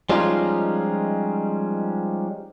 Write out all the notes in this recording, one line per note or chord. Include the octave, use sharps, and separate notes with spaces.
F3 G3 G#3 C#4 D#4 F4